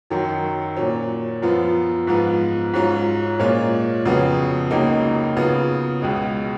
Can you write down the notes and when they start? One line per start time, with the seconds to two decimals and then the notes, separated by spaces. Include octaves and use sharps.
0.10 F#2 D#3 F#3
0.76 A#2 F#3 C#4
1.42 F#2 F3 B3 F4
2.07 G#2 F3 B3 F4
2.74 G#2 F#3 C#4 F4
3.39 A#2 G#3 C#4 F4
4.05 F2 C#3 F#3 B3
4.71 C#2 C#3 F#3 A#3 D#4
5.36 C#3 F#3 B3 F4
6.02 C#2 B2 G#3